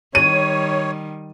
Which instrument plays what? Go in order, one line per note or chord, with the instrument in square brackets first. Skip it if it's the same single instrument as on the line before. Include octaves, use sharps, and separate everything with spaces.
[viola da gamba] D#3 G3 [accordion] C#5 [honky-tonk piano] D#7